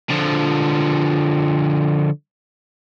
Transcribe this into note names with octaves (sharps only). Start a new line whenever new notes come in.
D3 F3